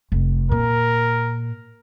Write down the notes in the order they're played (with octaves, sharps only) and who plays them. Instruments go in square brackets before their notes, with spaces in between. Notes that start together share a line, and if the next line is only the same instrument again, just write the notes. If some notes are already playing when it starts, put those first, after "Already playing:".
[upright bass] F1
[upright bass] A#2 [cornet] A#4